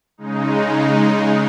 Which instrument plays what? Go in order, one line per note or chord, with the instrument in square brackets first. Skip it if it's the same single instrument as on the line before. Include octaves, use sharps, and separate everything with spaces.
[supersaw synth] C#3 G#3 D#4